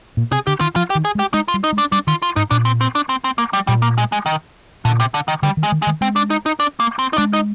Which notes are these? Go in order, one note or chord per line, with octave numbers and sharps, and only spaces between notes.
A#2
C3 G#4
D3 G4
D#3 F4
F3 F4
G4
D#3
G#4
G#3
G4
G#3 D#4
F4
G3
D#4
G#3
D4
G3 D4
D#3 F4
F4
G#2 D#4
A#2 D4
C4
C4
D4
C4
C4
A#3
G3
A#2 G3
A#3
G#3
G#3
D#3
A#2 D3
C3
D3
D#3
D3 G3
D#3
G#3
D#3
G#3
D#3
G#3 C4
D4
D#4
D#4
D4
A#3
C4
D#4
G#3 D4
D#4